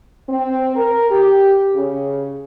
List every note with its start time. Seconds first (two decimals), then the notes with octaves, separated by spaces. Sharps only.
0.28 C4
0.75 A#4
1.10 G4
1.74 C#3